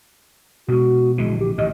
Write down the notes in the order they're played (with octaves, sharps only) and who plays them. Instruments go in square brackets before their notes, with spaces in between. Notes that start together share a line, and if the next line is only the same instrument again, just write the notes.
[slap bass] B2 G#3 [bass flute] F#4
[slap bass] A#1 D3 E3 [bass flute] G#3
[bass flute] G4
[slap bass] A1 A2 D#3 [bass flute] D#5